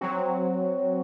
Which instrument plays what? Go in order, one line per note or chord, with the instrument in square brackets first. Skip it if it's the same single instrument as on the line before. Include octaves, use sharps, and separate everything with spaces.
[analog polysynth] F#3 C4 F#4